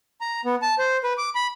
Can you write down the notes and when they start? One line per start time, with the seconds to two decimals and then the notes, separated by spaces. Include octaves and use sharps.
0.21 A#5
0.45 B3
0.62 A5
0.79 C5
1.03 B4
1.18 D6
1.35 B5